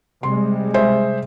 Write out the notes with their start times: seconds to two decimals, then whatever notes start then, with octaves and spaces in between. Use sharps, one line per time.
0.23 C3 G3 G#3 C6
0.74 G#4 C5 E5